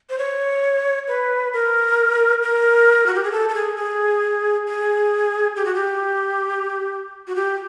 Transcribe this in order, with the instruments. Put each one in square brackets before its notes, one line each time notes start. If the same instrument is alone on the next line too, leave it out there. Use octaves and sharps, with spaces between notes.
[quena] C5
C#5
B4
A#4
A#4
F#4
G4
G#4
A4
A4
G#4
G#4
G#4
G4
F#4
G4
F#4
G4